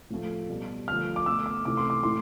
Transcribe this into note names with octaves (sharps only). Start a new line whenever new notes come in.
A2 F3 A3
B2 G3
D3 F3 A3 F6
D6
B2 A3 E6
D6
C3 E3 A3 D6
C6
D6
A2 E3 C6